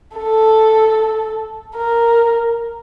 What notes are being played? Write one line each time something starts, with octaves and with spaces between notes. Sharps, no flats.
A4
A#4